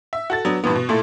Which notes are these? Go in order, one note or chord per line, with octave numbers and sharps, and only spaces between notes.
E5
F#4 A4 A6
F#3 B3 D4
G2 A#2 E3 B3
B2
A#2 A3 E4 A4